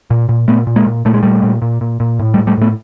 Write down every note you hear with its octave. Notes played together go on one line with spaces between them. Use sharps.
A#2
A#2
A#2 A3 B3
A#2
G#3 A#3
A#2
A#2 A3
G#3
A#2 G3 A3
A#2
A#2
A#2
A#2
A2
G3 A3
A2
G3 A3
A2 A3 B3